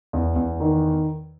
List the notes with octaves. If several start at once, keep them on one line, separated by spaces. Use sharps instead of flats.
E2
E2
D#3